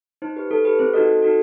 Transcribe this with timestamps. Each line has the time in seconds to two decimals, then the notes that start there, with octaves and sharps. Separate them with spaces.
0.22 D#4 C5
0.36 G4 B4
0.51 D#4 A4
0.65 G4 B4
0.79 C4 C5
0.94 D#4 F#4 A4 D#5
1.08 C4
1.22 D#4 F#4 A4